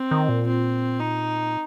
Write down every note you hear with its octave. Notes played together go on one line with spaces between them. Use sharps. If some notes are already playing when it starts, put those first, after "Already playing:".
Already playing: C4
D#3
A#2
C4
D#4